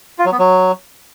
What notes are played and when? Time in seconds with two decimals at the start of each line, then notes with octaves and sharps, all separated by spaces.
0.19 F4
0.26 F#3
0.32 B3
0.39 F#3